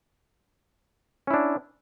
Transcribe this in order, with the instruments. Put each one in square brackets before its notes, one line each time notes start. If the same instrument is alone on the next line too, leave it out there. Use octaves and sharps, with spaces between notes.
[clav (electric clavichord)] C#4
E4
D4